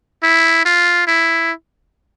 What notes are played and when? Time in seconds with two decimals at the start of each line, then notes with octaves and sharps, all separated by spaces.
0.23 E4
0.65 F4
1.08 E4